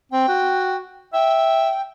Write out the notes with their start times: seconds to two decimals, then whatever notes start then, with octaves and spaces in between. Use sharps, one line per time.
0.12 C4 G5
0.28 F#4
1.13 E5 G5